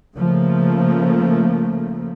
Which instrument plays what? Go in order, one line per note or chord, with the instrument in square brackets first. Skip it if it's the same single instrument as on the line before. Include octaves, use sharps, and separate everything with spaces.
[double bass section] C#3 F3 A3 A#3